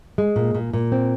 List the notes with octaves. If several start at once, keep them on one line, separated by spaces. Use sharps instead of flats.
G#3
A#2
A#2
A#2
C4